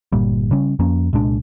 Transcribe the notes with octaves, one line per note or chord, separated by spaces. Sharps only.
G1 A#2 G3
C#3 G3 C#4
F2 F3 A#3 C#4
C2 A#2 G#3 D4